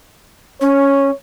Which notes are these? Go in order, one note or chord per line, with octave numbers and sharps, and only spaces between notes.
C#4 C#5